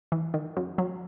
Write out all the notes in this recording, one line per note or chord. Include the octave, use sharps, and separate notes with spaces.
E3
D#3
F#2
F#3